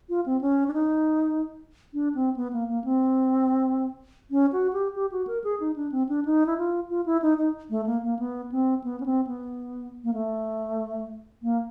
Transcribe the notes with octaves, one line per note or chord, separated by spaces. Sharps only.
F4
C4
C#4
D4
D#4
D4
C4
B3
A#3
A#3
C4
C#4
F#4
G4
G4
F#4
A#4
G#4
D#4
D4
C4
D4
D#4
E4
F4
F4
E4
D#4
D#4
A3
A#3
A#3
B3
C4
B3
C#4
C4
B3
A#3
A3
A#3